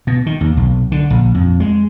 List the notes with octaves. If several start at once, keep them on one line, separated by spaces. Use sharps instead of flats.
B2
D#3
D#2
B1
D3
A#1
F2
G#3